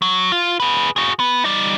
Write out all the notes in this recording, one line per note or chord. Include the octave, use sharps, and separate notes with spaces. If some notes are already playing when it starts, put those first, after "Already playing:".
F#3
F4
G#4 B4
F#4 G#4
B3
G3 D#4